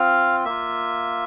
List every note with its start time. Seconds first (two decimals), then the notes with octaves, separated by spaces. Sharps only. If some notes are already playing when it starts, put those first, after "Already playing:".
Already playing: C4 F4 F5
0.45 A#3 F4 E5